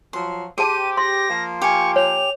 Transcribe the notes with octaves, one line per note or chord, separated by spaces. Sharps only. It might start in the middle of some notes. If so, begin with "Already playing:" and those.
F3 F#3 C6
G4 G#4 C5 A5 D#7
C6 A#6
F3 A#3 F4
G4 G#5 C#6
C#5 F7